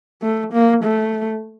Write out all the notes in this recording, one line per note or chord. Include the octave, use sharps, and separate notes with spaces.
A3
A#3
A3